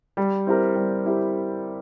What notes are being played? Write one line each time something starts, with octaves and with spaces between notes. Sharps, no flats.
G3
C4 E4 G4 A#4
G3
C4 E4 G4 A#4